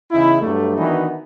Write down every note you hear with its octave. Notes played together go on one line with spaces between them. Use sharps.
E2 C#3 D#4 E4
G2 F#3 G3 A3
D#3 E3 B3 D4 D#4 F#4